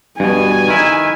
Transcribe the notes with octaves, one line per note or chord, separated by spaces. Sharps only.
G2 B2 G#5
D#3 E4